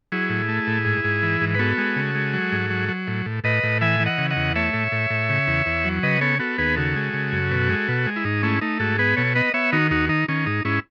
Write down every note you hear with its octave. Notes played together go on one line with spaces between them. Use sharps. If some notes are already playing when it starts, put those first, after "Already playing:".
F#3 E4 G#4
A2
A3
A2
G#2
G#2
E3
G#2
B4
B3 F#4 A4
G#3
C#3
G#3
F#3
G#2
F#3
F#3
A2
A2
A2 B4 D#5
A2
E3 E5 G#5
E3
D#5 F#5
C#3
D#5 F#5
E2
A3 C#5 E5
A2
A2
A2
C#3
E2
E2
F#3
C#3 B4 D#5
B3 A4 C#5
B3 F#4 A4
D#2 G#4 B4
C#3 F#4 A4
G#3
C#3
F#2
B2
G#3
B2
G#3
E4
G#2 D#4
A3 C#4 E4
A3 D#4
G#2 F#4 A4
B3 G#4 B4
B2 A4 C#5
B3 B4 D#5
B3 C#5 E5
D#3 D#4 F#4
D#2 D#4 F#4
D#3 D#4
D#3 C#4
G#2 D#4
G#2 C#4 E4